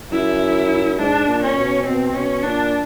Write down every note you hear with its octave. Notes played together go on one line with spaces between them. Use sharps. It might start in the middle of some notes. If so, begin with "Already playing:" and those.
F#2 E4
G#2 D4
A#2
C#4
B2
B2 C4
B2 C#4
A#2 D4